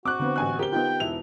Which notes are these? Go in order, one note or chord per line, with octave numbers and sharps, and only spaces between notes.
C4 F#4 D6 F#6
D3 B3 C4
A1 G#5 F#6
G4 A#4 C5 G7
B3 D#4 F4 G5
E1 E4 F7